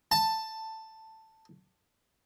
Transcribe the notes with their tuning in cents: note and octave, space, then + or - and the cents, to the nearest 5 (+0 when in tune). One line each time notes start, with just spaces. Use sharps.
A5 +10